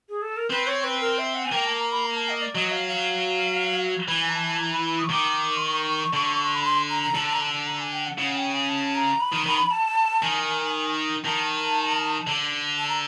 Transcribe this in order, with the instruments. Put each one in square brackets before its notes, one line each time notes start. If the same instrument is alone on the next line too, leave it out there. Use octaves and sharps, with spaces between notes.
[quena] G#4
A4
A#4
[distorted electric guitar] C4 [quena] B4
[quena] C#5
B4
A#4
E5
F#5
G#5
[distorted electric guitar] A#3 [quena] G5
[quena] A5
A#5
B5
A#5
A5
D#5
D5
[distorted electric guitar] F#3 [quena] D#5
[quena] F5
F5
[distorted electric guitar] E3
[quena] G#5
A#5
A5
A5
A#5
B5
B5
D#6
C#6
[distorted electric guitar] D#3 [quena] D6
[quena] C6
C#6
[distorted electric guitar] D3
[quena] B5
C6
A#5
A#5
[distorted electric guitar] D3 [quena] A5
[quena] A#5
A5
A5
A#5
G#5
G5
F#5
[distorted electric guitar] C#3 [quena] F#5
[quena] G5
G#5
A5
A#5
B5
[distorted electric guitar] D#3
D#3
[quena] A5
[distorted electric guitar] D#3 [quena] G#5
[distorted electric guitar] D#3 [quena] A5
[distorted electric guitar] D3
[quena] A5
A#5